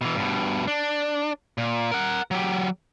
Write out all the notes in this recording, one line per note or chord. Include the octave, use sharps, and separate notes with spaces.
B2 E3
G2 B2
D4
A#2
A#4 F#5
F#3 G4